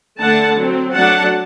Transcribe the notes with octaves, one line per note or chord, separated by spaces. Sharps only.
D3 A3 D4 F#5 A5
F#3 C4
F#3 A3 D4 F#5 A5